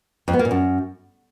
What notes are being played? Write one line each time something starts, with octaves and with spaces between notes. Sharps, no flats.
F2
B3
A#3
A#2
F#2